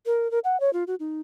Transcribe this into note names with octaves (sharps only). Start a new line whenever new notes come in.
A#4
A#4
F#5
C#5
F4
F#4
D#4